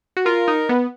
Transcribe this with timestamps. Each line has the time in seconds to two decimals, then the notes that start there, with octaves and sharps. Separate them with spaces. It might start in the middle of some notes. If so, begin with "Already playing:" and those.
0.17 F#4
0.25 F4 A#4
0.48 D#4
0.69 B3